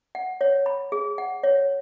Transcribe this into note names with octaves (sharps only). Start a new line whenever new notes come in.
F#5
C#5
B5
G#4
F#5
C#5